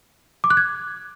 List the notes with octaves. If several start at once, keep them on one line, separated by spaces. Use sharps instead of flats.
D6
F#6
G#6